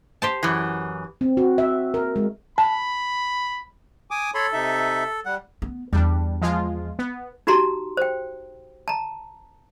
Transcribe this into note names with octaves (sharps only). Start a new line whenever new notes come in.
G4 C5 A5
F#2 E3
C4
F#4
E5
A#4
G#3
A5 B5
G#5 D6 D#6
A4 C#5 B5 C6
C3 D#4 E5
G3 F#5
B3
E2 G3 D4
F3 G#3 F4
B3
D#4 F#4 G4 A#5 C6
C5 G5
A5 A#5